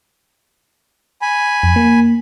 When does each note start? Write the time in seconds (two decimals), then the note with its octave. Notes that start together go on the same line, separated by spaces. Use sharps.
1.22 G#5 B5
1.63 F2
1.76 A#3